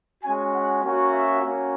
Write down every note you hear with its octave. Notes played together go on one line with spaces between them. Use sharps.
G#3 C#4 F#4 G#5
F#5
A#3 C#4 F#4
E5
A#3 C#4 F#4